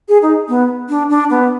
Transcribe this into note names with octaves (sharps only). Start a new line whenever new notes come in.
G#4
D#4
B3
D4
D4
B3